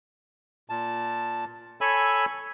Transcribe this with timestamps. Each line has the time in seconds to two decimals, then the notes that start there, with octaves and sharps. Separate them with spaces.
0.69 A#2 A5
1.81 A4 C#5 G#5 B5 E6